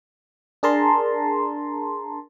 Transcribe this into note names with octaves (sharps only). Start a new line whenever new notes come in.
D4 G#4 A#4 A5 A#5 C6